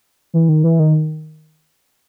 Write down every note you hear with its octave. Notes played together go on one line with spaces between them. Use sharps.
E3
D#3
E3
D#3